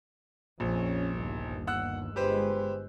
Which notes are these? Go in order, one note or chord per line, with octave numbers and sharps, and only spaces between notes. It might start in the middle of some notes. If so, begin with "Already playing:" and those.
A#1 F2 C#4
G1 D#2
F#5 E6 F#6
G1 G#3 G4 B4 C5